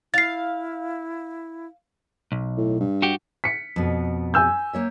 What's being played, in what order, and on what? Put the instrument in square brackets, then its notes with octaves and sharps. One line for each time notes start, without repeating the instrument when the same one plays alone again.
[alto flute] E4 [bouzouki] F5 [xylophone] A6 C7
[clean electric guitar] B1
[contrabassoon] A2
G2
[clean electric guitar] F#4 G4
[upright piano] B6 C#7
[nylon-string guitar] F2 B2
[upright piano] G#5 E6 G6
[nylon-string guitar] A#3 C#5 E5